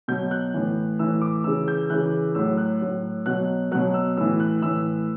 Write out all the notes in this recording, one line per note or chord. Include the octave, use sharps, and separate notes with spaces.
B2 F#3 G6
F#6
A2 E3
A2 E3 E6
D6
C#3 E3 E6
G6
C#3 E3 F#6
A2 F#3 E6
F#6
A2 F#3
B2 F#3 F#6
B2 F#3 F#6
E6
A2 E3 E6
F#6
A2 E3 E6